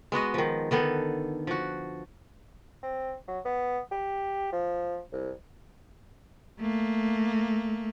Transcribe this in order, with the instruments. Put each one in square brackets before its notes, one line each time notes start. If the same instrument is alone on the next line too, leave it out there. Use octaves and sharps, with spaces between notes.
[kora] G#3 B3 F#4 D#5
D#3 F3
D3 D#3 B3 A4
F3 F#4
[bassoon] C4
F#3
B3
G4
F3
C2
[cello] A3 A#3